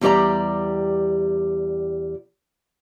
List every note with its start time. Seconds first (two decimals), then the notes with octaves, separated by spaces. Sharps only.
0.01 E2 G3 G4 D5 A#5